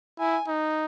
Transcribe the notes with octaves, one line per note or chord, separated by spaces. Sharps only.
E4 G#5
D#4